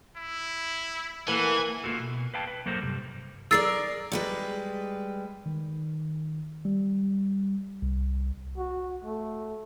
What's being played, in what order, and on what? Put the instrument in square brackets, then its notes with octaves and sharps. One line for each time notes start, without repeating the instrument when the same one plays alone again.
[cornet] E4
[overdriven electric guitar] E3 [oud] A#3 A4 [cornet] F#5 [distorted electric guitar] G#5
[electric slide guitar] A#3 F4 F#4 A4
B2
B4 F5 G5 A5
B4
F#3 A#3 A4 A#4 C5
G2 C3 G3
[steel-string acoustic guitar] G#4 A#4 D5 [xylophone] E6 A6 C7
[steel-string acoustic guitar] G3 G#3 B4
[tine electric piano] D#3
G3
C2
[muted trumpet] F#4
A3